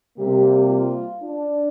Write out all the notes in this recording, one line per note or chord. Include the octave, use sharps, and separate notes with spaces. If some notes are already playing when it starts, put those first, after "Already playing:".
C3 G3 A#3 G4
F4
D4